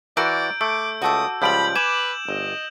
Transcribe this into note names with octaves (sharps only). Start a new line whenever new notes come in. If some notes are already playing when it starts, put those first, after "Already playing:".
E3 F#4 A#4 D5 E6 G6 D7
A3 D6 E6
C#2 A3 F#4 A4 D6 D#6
C#2 F3 G3 B5 G6 D7 F#7
B4 G#5 D6 E7
G1 D#5